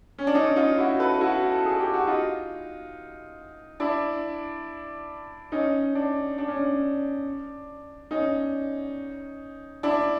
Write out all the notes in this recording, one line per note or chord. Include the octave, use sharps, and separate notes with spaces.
C#4
D4
C#4 D#4
D#4 F4
E4 F#4
A4 B4
E4 F#4
A4
G#4
G4
F#4
D#4 F4
D4 E4
C#4 D#4
D4
D4
C#4
D4
C#4 D#4
D4 E4